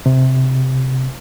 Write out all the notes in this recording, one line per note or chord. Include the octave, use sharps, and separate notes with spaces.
C3